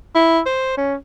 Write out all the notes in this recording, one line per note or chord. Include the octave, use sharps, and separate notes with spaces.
E4
C5
C#4